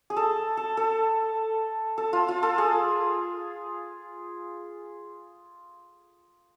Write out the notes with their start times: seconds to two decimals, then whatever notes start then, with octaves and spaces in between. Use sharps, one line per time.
0.10 G#4
0.16 A4
0.57 A4
0.77 A4
1.98 A4
2.13 F4
2.28 F4
2.43 A4
2.58 G#4